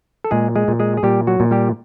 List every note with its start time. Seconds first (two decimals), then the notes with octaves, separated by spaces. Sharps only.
0.24 A4
0.31 A#2 G#3 G#4
0.56 G#3 G#4
0.68 A#2
0.80 G#3 G#4
0.97 G#4
1.03 A#2 G3 G4
1.27 F#3 F#4
1.40 A#2
1.51 G3 G4